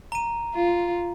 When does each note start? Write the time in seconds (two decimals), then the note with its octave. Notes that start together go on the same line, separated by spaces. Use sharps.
0.12 A#5 D#7
0.55 F4